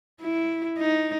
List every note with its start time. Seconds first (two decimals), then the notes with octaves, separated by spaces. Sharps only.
0.21 E4
0.79 D#4